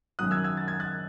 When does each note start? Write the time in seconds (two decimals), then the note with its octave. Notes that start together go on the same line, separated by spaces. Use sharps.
0.19 F#2 D#3 F#3 D#6 F#6
0.31 E6 G#6
0.44 E6 G#6
0.57 A6
0.68 G#6
0.80 F#6 A6